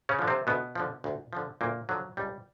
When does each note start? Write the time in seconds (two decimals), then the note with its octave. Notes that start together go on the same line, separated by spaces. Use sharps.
0.09 C#3 C#4
0.19 D3 F3
0.28 C3 C4
0.47 D2 B2 B3
0.75 D3 F3
1.04 D2
1.33 D3 F3
1.61 D2 A#2 A#3
1.89 D3 F3 F#3
2.17 C#2 G3